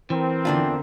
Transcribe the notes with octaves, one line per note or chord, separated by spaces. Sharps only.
E3 C4 A#4
E2 D3 D4 F4